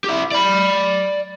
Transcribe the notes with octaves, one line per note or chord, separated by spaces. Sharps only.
E4 G4
D5 B5